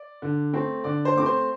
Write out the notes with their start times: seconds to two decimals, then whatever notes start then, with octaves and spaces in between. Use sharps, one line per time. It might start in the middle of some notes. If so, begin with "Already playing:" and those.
Already playing: D5
0.22 D3
0.53 A3 C4
0.84 D3 D5 D6
1.05 C5 C6
1.15 A3 C4 D6
1.26 C5 C6